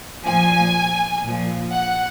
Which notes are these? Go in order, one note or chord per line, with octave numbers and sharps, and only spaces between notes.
A#2 F3 G#5
A#2
F3
F#5